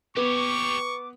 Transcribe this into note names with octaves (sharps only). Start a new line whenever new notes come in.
B3 G4 C#5 C#6 D6